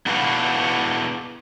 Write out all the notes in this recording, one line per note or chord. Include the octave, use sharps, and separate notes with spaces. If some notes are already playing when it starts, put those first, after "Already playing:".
B3 D4 E4 F#4 B4 F5